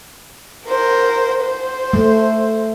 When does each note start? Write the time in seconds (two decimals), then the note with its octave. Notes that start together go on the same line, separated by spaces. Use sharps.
0.66 A#4 C5
1.41 C5
1.93 A3